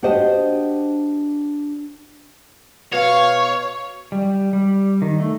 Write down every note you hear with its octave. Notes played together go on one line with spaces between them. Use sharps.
D4 F#4 G4 C5 D#5
B2 C#5 F5
G3
G3
D#3
A3